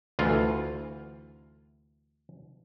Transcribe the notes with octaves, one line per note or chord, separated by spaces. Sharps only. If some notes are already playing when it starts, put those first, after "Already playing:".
D2 E3 F4